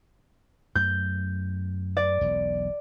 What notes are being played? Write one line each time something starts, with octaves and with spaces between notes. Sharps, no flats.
F#2 A3 G6
D5
E1 B1 E2